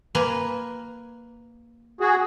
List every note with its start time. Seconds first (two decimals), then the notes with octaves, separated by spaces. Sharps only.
0.15 A#3 B4 G#5
2.01 F#4 G#4